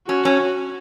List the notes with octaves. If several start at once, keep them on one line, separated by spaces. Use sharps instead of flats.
C#4 F#4
C#4